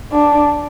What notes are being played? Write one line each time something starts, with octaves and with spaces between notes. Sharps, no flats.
D4